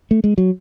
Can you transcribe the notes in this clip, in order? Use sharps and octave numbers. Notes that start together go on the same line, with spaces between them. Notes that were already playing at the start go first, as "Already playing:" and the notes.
A3
G#3
F#3